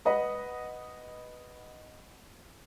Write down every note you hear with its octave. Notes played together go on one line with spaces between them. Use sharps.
B4 D#5 F#5 B5